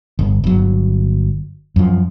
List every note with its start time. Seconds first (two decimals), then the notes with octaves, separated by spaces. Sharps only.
0.19 G1
0.44 G1 F#3
1.76 F#2 F3